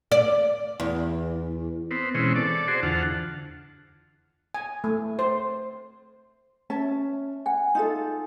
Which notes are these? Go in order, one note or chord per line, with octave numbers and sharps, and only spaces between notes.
D5
E2
B3 C4
B2 E3 G#3 C4 C#4
A4 D5
F#4 G#4 C5
E2 D3 F4 F#5 A5
G#5
A3
C5
C#4 E5 A5
F#5 G#5
D#4 F4 A4